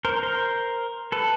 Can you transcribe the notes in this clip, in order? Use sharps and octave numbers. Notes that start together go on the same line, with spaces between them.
A#4 C5
A#4 C5
A4 B4